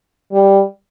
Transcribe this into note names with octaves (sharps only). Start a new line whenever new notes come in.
G3